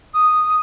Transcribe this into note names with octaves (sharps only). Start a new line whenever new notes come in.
D#6